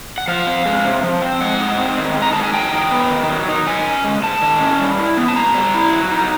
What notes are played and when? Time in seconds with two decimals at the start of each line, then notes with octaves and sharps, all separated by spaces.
0.18 F#5
0.28 F3 F5
0.47 C4
0.66 G#3
0.85 C3
1.03 F3
1.22 C4
1.41 G#3 F#5
1.60 D#4
1.78 C4
1.98 D#3
2.17 G#3
2.22 A#5
2.33 D#4 A5
2.43 G#5
2.53 F#3 G5
2.72 D#4
2.91 B3
3.10 D#3
3.29 F#3
3.48 D#4
3.67 D#3 G#5
3.86 C#4
4.04 G#3
4.23 G#2 A5
4.42 D#3
4.60 C#4
4.79 G3
4.98 E4
5.17 B3
5.28 A5
5.36 B2 A#5
5.54 G3
5.74 E4
5.92 F#3
6.11 D#4